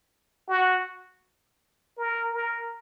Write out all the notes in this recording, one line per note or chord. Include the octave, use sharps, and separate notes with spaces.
F#4
A#4
A#4